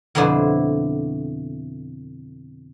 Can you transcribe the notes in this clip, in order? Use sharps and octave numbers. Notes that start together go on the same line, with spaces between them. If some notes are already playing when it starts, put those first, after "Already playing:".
F2 B2 D3 D4 E4 C5